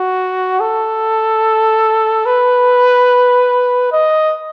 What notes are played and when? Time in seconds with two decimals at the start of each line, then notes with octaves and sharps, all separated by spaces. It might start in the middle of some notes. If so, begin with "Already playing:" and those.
Already playing: F#4
0.60 A4
2.26 B4
3.92 D#5